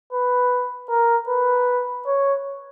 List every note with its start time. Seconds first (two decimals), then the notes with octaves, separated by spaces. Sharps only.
0.13 B4
0.90 A#4
1.28 B4
2.07 C#5